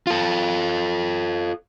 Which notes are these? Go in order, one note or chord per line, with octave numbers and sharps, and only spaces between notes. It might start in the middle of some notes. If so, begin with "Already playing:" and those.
F4 A4